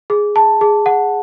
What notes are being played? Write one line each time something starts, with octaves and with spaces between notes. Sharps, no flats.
G#4
A5
G#4
F#5